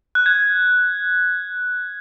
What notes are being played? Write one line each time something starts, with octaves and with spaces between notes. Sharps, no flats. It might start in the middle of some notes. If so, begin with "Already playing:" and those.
F#6
G#6